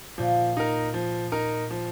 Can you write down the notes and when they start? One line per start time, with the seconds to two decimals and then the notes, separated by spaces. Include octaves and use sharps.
0.18 A#2 F3
0.57 D#4 A#4
0.94 F3
1.32 D#4 A#4
1.71 F3